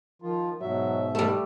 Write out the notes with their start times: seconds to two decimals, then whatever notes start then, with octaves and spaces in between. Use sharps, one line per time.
0.22 D#3 F3 F4
0.61 G#2 B2 F#3 E5
1.15 G3 A3 G4